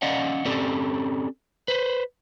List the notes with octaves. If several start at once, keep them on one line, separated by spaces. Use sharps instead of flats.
C#4 D5 D#5 F5 F#5
C4 C#4 G4 A4 D5
B4 C5